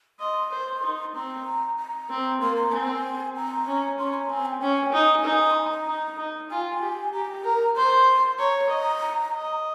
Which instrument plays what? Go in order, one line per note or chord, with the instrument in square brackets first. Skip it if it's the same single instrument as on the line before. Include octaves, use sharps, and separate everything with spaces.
[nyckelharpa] D#5 [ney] C6
[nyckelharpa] C5
D#4
[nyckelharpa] C4 [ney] A#5
[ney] A#5
[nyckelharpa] C4
[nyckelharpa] A#3 [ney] C6
[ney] A#5
[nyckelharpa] C4 [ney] G#5
[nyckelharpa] C4 [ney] A#5
[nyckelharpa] C#4
[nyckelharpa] C#4 [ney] C6
[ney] A#5
[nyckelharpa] C4 [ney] G#5
[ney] G5
[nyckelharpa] C#4 [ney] G5
[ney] G#5
[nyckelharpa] D#4
D#4
[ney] C6
A#5
A#5
[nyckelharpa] D#4
D#4
[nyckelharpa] F4 [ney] G#5
[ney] G5
G#5
[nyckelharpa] G4
[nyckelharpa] G4 [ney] A#5
[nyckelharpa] A#4
[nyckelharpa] C5 [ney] C6
[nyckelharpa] C#5 [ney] A#5
[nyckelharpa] D#5
D#5